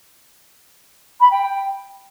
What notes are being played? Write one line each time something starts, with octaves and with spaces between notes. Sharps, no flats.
B5
G5
G5